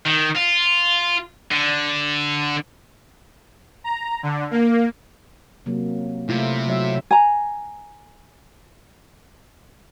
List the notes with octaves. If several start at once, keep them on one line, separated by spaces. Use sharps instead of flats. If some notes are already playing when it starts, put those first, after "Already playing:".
D#3
F4
D3
A#5
D3
A#3
C3 F#3 A#3
C3 A3 E4 F4
F#3 E5
G#5 A#5